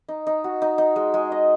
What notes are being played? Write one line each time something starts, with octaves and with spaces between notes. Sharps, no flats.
D#4
D#4
F#4
D#4
D#4
G#3
G#3
D#5